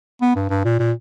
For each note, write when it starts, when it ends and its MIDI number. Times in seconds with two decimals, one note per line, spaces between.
0.21 0.33 59
0.36 0.47 43
0.49 0.63 43
0.64 0.78 46
0.79 0.92 46